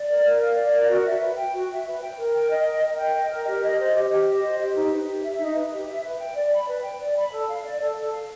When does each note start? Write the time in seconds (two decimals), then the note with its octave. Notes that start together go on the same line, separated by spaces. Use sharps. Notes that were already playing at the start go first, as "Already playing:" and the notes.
Already playing: D5
0.09 A#4
0.24 A#4
0.41 F5
0.56 D5
0.73 A#4
0.89 F#4
1.05 E5
1.21 B4
1.37 G5
1.53 F#4
1.69 E5
1.86 B4
2.02 G5
2.18 A#4
2.34 G5
2.50 D#5
2.66 A#4
2.82 A#4
2.98 G5
3.14 D#5
3.31 A#4
3.46 G4
3.63 D#5
3.79 C5
3.94 G4
4.11 G4
4.26 D#5
4.42 C5
4.58 G4
4.74 D#4
4.91 B4
5.07 G4
5.24 E5
5.39 D#4
5.55 B4
5.72 G4
5.88 E5
6.03 B4
6.19 G5
6.36 D5
6.52 B5
6.68 B4
6.84 G5
7.00 D5
7.16 B5
7.32 A4
7.49 F5
7.65 D5
7.80 A4
7.96 A4
8.13 F5